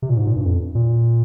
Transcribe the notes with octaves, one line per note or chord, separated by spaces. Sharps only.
C3
A#2
G#2
A#2
G2
F2
A#2